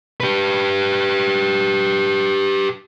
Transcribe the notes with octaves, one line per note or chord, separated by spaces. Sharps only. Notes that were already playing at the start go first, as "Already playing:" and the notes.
G4 B4